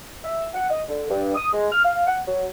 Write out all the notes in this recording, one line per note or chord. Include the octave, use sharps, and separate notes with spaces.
E5
F#5
D#5
D3
G2
D#6
G#3
F6
F5
F#5
F#3